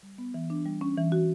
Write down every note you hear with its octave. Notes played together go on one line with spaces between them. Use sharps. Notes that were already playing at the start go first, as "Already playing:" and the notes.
G3
B3
E3
D4
G3
C#4
E3
F#4